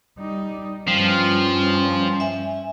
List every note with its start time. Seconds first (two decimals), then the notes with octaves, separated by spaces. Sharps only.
0.19 G3 D#4
0.88 G2 F3 G3 C#4
2.20 E5 G#5